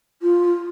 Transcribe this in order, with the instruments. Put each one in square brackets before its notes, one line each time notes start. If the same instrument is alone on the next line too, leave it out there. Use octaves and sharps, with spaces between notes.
[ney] F4